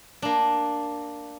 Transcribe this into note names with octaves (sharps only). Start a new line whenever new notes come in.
A#3 D4